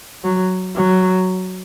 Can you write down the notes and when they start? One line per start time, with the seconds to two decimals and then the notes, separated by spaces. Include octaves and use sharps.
0.24 F#3
0.76 F#3